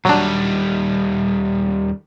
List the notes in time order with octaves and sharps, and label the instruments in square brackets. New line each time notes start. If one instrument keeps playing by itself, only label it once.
[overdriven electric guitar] D#2 G3 [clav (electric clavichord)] F#3 D4